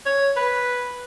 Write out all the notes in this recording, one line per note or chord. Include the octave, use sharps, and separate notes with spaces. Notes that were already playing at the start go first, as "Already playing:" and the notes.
C#5
B4